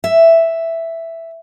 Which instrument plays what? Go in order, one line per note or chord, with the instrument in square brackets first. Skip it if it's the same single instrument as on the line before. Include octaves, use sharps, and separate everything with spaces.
[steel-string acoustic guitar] E5